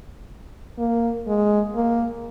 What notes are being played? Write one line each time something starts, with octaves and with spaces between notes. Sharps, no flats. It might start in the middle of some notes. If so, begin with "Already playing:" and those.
A#3
G#3
A#3